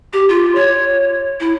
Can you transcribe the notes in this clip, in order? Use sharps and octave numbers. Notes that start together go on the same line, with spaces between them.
G4
F4
C#5
E4